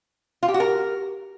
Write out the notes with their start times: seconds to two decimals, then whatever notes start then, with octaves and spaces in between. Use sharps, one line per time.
0.43 F4
0.48 G4
0.54 F#4
0.60 A#4